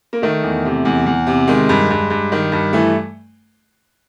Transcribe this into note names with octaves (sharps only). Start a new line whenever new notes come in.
A#3
D#3 A3
E2
C3
E2
E2
C3
D#3 G#3
G2
G2
G2
D#3
G2
E3 A3